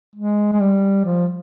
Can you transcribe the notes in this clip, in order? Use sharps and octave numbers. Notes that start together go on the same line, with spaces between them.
G#3
G#3
G3
F3